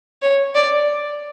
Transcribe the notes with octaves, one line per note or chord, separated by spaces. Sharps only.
C#5
D5